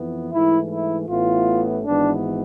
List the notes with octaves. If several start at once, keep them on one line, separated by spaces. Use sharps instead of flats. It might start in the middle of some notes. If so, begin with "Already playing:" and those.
Already playing: F2 E3 B3
G#2 E3 A3 E4
E4
A1 A2 E3 B3 F4
G#1 G#2 E3 B3 D4